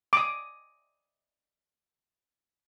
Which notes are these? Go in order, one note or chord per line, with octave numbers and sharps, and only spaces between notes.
D6 D#6